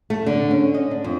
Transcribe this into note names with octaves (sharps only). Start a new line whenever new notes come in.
A3
D3
C#4
D#5
D4
F2